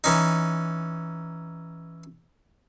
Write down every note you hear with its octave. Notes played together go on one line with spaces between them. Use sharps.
E3 C#4 D#4